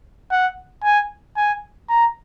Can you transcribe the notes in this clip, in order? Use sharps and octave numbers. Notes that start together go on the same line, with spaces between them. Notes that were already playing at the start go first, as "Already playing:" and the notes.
F#5
G#5
G#5
A#5